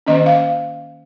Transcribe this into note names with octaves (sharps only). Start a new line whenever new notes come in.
D#3 A#3 C#4 D#5
F5